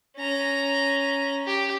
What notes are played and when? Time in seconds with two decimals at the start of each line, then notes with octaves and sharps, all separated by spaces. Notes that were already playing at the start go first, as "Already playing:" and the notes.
0.17 C#4 A#5
1.46 G4